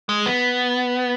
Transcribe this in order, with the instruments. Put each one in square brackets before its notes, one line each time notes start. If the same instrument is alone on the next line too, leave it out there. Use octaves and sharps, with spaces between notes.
[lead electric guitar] G#3
B3